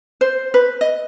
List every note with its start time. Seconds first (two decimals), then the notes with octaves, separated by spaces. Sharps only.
0.21 C5
0.54 B4
0.81 D#5